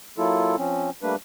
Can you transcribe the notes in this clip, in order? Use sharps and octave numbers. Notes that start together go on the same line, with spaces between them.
F#3 A#3 E4 F4 A4
F3 C4 C#4
G3 A3 A#3 D4 B4